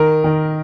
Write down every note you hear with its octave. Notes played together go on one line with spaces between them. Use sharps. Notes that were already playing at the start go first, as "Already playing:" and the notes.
Already playing: D#3 A#4
D#3